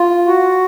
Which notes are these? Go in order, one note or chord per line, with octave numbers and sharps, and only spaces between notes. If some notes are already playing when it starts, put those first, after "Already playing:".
Already playing: F4
F#4